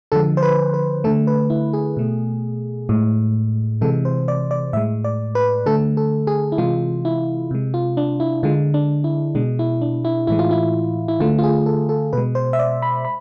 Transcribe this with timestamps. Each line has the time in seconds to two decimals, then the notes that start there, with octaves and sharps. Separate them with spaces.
0.12 D3 F3 G#3 A4
0.37 C5
0.43 B4
0.74 B4
1.04 D3 A3 A4
1.27 B4
1.50 E4
1.73 G#4
1.97 B2 A3
2.89 A2 G#3
3.81 C3 E3 G#3 A4
4.05 C5
4.28 D5
4.51 D5
4.73 A2 G#3 E5
5.04 D5
5.35 B4
5.66 D3 A3 A4
5.97 A4
6.27 G#4
6.52 E4
6.58 C3 E3 G#3 F4
7.05 E4
7.51 C3 G#3
7.74 F4
7.97 D4
8.20 E4
8.43 D3 G#3 F4
8.74 D4
9.04 E4
9.35 B2 G#3 D4
9.59 E4
9.81 D4
10.05 E4
10.27 A2 E3 G#3 E4
10.39 F4
10.51 E4
11.08 E4
11.20 D3 A3 F4
11.39 F4
11.43 G#4
11.66 A4
11.89 A4
12.13 B2 G#3 B4
12.35 C5
12.53 E5
12.59 D5
12.82 B5
13.05 B5